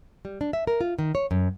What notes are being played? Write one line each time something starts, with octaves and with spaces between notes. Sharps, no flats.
G3
D4
E5
A#4
F4
D#3
C#5
F#2